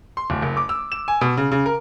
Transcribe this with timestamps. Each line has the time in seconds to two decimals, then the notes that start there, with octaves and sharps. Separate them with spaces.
0.17 C6
0.30 D1
0.42 F#1
0.57 D6
0.69 E6
0.92 E7
1.08 G#5
1.21 B2
1.37 C#3
1.51 C#3
1.66 A#4